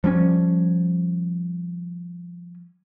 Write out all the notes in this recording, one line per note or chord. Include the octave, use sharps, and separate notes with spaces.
F3 G3 C4 C#4